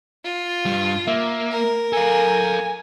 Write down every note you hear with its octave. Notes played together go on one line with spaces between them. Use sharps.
F4
G2 G3
A#3 E5
A#4
A4 F5 G#5